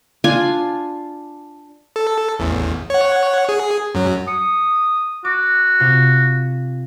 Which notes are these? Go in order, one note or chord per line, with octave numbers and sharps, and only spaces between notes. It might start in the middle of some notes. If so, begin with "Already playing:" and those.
D4 F4 G#5
A4
A1 E2
C#5 F#5
G#4
F#2 F#3
D#6 C#7
F#4 D6
C3 F4